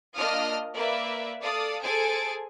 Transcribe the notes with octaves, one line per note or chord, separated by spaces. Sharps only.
A#3 D4 F4 D#5 D#6 F6
A#3 B4 D5 E5
A4 D5 F5 D#6 A6
G#4 A4 C5 G#5 A6 D7